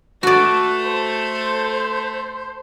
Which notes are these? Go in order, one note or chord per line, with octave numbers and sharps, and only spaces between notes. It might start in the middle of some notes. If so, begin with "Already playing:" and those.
A3 F#4 A4 B4 D5
C5